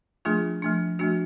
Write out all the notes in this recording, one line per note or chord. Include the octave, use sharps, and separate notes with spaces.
F3 A3 D4 F4 G#4
F3 A3 D4
F3 A3 D4 F#4